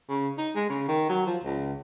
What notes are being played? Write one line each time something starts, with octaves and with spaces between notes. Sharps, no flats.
C#3
D#4
G#3
C#3
D#3
F#3
F3
C#2